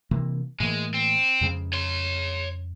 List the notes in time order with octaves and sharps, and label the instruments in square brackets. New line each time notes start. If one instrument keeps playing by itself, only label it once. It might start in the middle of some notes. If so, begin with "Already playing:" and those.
[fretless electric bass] C3 E3 A#3
[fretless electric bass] A2 E3 A#3 [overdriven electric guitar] G#3
[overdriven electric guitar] C4
[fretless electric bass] F2 C#3 G#3
[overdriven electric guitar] C#5 C6